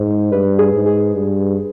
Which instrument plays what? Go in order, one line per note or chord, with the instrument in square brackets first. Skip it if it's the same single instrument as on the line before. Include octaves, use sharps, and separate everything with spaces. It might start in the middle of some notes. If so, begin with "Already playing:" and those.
Already playing: [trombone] G#2 [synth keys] C5
[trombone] G2 [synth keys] B4
[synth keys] G#4
[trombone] G#2
[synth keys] G#4
[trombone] G2